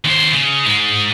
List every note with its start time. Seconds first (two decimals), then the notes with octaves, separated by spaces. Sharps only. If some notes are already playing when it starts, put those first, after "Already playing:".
0.04 D#2 C5
0.33 C#3
0.65 G#2 G#3